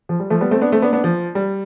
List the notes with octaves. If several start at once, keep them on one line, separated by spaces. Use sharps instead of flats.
F3
G3
F3 A3
G3 B3
A3 C4
B3 D4
A3 C4
B3 D4
B3 D4
F3
G3